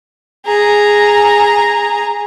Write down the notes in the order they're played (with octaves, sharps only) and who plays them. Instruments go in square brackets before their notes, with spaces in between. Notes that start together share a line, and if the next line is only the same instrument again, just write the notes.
[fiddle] G#4 A#5